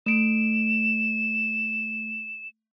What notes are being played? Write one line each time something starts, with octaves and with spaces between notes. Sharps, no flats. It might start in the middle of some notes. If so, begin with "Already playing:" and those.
A3 D7 E7